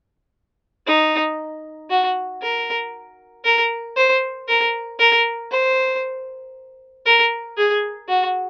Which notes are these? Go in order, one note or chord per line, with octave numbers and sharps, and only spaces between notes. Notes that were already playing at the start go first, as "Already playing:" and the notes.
D#4
F#4
A#4
A#4
C5
A#4
A#4
C5
A#4
G#4
F#4